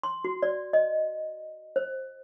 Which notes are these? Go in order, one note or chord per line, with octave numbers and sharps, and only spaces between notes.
C6
F#4
D5
D#5
C5